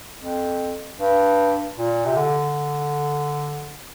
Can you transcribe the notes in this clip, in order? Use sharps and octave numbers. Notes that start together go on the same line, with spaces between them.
F2
G2
A#2
C3
D3